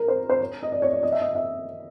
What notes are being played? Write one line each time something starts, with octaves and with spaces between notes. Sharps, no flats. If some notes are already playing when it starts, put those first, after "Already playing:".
Already playing: A#4
C5
C5
C#5
D#5
D5
C#5
D5
D#5
E5
D#5
E5